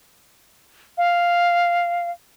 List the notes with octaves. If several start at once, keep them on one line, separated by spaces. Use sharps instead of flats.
F5